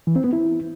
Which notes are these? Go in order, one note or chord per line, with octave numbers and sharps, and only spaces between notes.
E3
C4
B3
E4